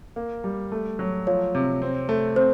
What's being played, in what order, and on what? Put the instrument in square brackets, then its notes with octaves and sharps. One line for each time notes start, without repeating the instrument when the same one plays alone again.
[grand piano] A#3
G3
A3
F#3
[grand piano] F3 [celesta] C#5
[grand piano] C3
C4
A3
[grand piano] C4 [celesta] C5